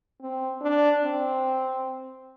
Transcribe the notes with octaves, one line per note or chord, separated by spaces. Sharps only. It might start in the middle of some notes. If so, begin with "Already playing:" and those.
C4
D4
C4